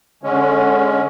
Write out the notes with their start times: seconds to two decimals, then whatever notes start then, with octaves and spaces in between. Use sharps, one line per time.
0.23 D3 G#3 C#4